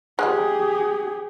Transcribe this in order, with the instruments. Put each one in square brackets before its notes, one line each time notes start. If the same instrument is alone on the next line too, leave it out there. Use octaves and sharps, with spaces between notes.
[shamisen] G#3 F4 F#5 [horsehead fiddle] G4 G#4